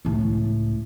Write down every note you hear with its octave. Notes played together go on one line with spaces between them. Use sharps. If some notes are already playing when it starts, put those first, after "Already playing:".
C#2 A2